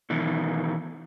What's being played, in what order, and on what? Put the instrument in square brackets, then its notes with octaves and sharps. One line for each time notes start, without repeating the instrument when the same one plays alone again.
[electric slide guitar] B2 D#3 E3